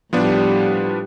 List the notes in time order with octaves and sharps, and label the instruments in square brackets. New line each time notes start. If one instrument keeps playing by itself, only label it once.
[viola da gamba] A2 G3 [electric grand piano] F3 B3 D4